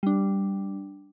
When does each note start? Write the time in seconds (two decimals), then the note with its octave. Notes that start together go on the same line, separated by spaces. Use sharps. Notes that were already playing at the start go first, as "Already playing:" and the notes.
0.03 G3 D4